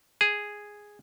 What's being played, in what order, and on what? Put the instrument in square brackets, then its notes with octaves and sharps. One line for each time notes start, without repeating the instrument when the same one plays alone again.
[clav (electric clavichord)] G#4